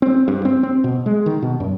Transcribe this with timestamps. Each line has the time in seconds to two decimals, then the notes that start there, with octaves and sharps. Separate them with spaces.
0.02 C4
0.28 G2
0.45 C4
0.63 C4
0.84 B2
1.06 G#3
1.26 D#3
1.42 B2
1.60 F#2